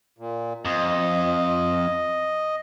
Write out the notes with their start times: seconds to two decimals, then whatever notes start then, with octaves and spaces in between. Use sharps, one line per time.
0.18 A#2
0.65 F2 D#5